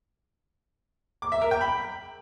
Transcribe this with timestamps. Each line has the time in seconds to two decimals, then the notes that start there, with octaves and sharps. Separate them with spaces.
1.22 D6
1.32 E5
1.42 A#4
1.51 G5
1.61 B5